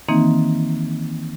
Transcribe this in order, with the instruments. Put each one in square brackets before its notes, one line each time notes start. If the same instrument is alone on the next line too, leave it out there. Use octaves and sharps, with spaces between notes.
[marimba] D#3 E3 A#3 C4 D#4